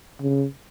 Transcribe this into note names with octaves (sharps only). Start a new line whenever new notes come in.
C#3